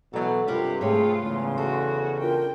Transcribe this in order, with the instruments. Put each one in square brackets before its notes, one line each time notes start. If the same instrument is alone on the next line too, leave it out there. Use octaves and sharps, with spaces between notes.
[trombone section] B2 E3 F#3 [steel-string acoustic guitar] A4 D5
[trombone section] G2 C3 [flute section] F4 [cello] G4 [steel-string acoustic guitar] A#4 B4 F5
[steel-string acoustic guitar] G#2 B4 C#5 [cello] A3 F4 [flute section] G#4 G5
[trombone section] E2 C#3 [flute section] C6
[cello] F#4 [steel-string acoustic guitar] A4
[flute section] D4 F4 A#4 [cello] G5